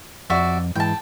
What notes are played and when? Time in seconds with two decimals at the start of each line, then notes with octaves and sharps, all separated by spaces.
0.30 F2 F#4 D5 E5
0.75 G#2 E3 G5 A5